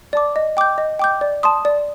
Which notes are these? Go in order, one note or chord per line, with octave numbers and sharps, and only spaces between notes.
D5 A5 D6
D#5
G5 D6 G6
D#5
G5 D6 G6
D5
A5 C6 D#6
D5